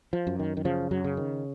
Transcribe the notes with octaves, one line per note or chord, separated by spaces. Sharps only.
F3
F#2
D#3
D#3
C#3 F3
F#2 F#3
C#3
D#3